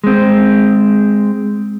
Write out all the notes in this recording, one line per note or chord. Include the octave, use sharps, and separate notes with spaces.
G#3 C4